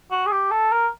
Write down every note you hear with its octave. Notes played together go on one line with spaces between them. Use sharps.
F#4
G#4
G4
A4
A#4